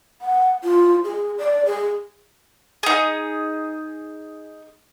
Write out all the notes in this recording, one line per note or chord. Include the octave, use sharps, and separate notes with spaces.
F#5
F4
G#4
D5
G#4
D#4 G#4